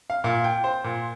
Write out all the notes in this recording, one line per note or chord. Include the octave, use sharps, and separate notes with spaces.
F5
A#2 F5
G5
C5
A#2